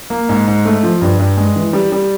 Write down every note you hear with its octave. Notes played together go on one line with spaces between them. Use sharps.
A#3
G#2
G#2
A3
F3
G2
G2
G#3
E3
G3
G3